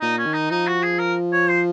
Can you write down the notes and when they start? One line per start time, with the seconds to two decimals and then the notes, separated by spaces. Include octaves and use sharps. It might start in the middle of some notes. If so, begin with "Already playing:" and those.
0.01 A#2 D#4
0.18 C#4
0.26 D#3
0.34 D#4
0.51 F3 D#4
0.67 F#4
0.83 G#4
0.99 A#4
1.33 C#5
1.49 C5